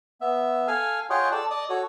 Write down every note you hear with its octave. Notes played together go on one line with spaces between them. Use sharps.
B3 E5
A4 F5 G#5 F6
F4 G#4 C#5 D#5 F#5 G5
A4 D5 A5
D5 D#5 D#6
F#4 A4 C#5